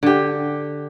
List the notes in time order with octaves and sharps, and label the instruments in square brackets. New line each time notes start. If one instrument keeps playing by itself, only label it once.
[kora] D3 G4